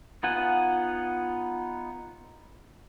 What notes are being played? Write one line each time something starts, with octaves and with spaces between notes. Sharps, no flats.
B3 D#4 F4 F#5 G#5